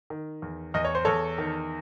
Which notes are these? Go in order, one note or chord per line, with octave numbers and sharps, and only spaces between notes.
D#3
E2
E2 D#5
C#5
C5
E2 A4 C#5
D#3